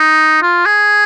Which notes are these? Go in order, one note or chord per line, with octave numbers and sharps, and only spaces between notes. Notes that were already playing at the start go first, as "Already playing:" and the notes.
Already playing: D#4
F4
G#4